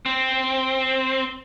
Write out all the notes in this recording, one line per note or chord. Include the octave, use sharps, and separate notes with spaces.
C4